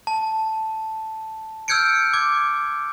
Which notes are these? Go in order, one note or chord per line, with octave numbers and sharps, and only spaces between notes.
A5
E6 F6 G6 G#6 C#7 D7
D6 G#6